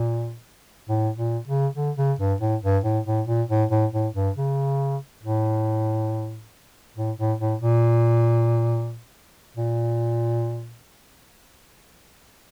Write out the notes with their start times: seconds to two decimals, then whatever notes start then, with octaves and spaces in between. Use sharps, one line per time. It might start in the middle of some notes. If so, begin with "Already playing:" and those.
Already playing: A#2
0.89 A2
1.18 A#2
1.47 C#3
1.75 D3
1.98 C#3
2.19 G2
2.40 A2
2.63 G2
2.84 A2
3.06 A2
3.27 A#2
3.49 A2
3.71 A2
3.93 A2
4.14 G2
4.36 C#3
5.23 A2
6.96 A2
7.18 A2
7.39 A2
7.61 A#2
9.56 A#2